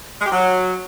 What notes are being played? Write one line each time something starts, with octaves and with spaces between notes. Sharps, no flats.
G#3
G4
F#3